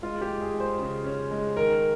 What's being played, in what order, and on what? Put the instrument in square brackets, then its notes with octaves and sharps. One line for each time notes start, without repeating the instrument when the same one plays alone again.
[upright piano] G#3 F4
G4
G#3
G#4
G#3
C5
C#3
C#4
G#3
D#3 A#4